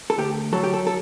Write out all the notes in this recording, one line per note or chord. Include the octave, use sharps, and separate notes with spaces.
A4
D2 G4
F#3 A4
G4
A4
A4